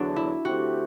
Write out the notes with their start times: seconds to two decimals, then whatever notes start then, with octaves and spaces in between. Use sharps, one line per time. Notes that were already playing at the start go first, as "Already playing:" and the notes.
Already playing: E2 D3 F#3 D4 F#4
0.16 E4
0.45 D3 A3 C4 F#4 G4